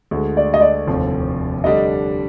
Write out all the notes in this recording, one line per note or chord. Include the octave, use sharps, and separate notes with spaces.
D2 D3 G#3
D5
D#5
D5
F1 D#2 D3 F3 C4
D3 G3 D4 D#5